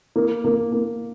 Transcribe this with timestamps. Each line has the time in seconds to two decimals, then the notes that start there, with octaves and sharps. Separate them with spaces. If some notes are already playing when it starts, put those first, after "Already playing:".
0.16 A#3
0.44 A#3
0.73 A#3